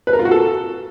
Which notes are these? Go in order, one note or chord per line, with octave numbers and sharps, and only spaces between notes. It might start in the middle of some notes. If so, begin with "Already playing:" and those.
B4
A#4
F4
F#4
A4